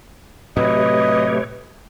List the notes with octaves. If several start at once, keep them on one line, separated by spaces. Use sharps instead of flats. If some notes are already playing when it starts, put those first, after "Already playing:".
A2 C3 F#3 A3 G4 B4 C#5 D#5